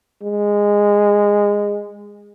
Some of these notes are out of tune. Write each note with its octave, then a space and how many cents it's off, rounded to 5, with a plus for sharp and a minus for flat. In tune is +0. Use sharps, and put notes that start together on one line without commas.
G#3 -15